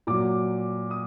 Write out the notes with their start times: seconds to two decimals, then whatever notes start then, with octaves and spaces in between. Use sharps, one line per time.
0.07 A#2 F#3 D6
0.91 D#6